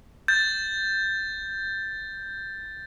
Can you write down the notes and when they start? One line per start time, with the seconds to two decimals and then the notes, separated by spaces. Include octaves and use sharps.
0.28 G6 A6